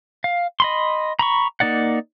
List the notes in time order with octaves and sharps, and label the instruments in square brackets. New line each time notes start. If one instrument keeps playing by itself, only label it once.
[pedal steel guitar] F5
D#5 B5 C6
A#5 B5 C#6
A#3 D#4 D5 F#5